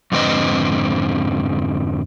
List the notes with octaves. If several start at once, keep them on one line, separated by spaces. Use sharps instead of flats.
F2 G#2 D3 C4 B4 D#5